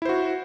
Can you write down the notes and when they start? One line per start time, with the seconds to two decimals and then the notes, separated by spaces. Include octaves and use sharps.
0.02 E4
0.05 C5
0.09 F#4